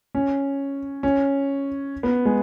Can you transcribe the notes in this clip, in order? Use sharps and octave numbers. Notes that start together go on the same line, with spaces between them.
C#4
C#4
B3
G#3